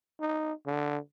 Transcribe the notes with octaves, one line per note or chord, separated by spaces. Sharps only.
D#4
D3